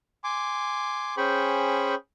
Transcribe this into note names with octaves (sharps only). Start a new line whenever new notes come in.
G#5 C6 D6
C#4 G#4 C5 G5 B5 C#6